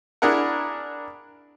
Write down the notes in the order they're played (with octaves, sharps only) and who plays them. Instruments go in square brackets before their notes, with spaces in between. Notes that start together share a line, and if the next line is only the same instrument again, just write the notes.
[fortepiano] D4 E4 G#4 A#4 F#5